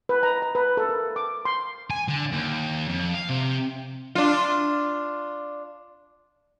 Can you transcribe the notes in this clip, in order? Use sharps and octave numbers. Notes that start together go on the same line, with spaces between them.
B4
A#5
A#5
B4
A4
A#4
D6
C6
G#5
D3
D#2
F2
F5
C3
D4 F4